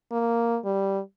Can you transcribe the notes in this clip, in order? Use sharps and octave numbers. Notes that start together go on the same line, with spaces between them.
A#3
G3